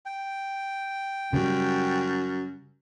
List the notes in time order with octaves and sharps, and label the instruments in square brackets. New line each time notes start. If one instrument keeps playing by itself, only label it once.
[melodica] G5
[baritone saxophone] F#2 [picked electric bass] C#3 G3